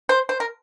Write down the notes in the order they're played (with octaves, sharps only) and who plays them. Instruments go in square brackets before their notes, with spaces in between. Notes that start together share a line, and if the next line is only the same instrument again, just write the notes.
[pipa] C5
C5
A#4